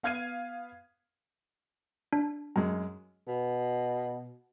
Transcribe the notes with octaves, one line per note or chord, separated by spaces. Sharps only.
B3 F5 F6 G#6 C7 D#7
D4
F#2 G#3
B2